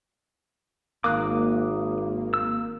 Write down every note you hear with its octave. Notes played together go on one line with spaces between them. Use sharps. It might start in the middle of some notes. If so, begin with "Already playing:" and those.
G#1 A#3 D6 D#6 F#6
E6